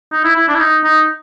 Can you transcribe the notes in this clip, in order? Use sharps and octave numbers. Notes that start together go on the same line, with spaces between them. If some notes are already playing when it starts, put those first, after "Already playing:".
D#4
E4
E4
D4
E4
D#4
D#4